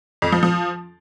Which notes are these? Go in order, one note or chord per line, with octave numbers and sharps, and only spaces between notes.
F2
F3
F3